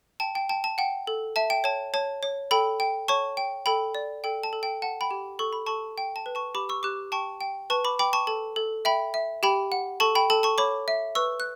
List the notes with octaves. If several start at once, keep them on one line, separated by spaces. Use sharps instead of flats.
G5 A5
G5
G5 A5
A5
F#5 G5
A4
E5 A5
G5
C#5 A5
C#5 A5
C#5
A4 G5 B5
G5
C#5 A5 C#6
G5
A4 G5 B5
D5
A4 G5
A5
A4
G5
F#5 A5
G5 B5
G4
A4 C#6
B5
A4 A5 C#6
G5
A5
B4
A5 C#6
G4 B5 D6
C#6 E6
G4 D6 F#6
G5 A5 C#6
G5
B4 A5 C#6
B5 D6
G5 B5 D6
A5 C#6
A4 A5
A4
E5 G5 B5
E5
G4 G5 B5
F#5
A4 A5 C#6
G5 B5
A4 A5
A5 C#6
C#5 B5 D6
E5
B4 C#6 E6
F#6